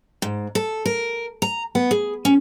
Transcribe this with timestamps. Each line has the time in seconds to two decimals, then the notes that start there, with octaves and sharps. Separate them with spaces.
0.22 G#2
0.55 A4
0.85 A#4
1.42 A#5
1.75 B3
1.91 G#4
2.25 C#4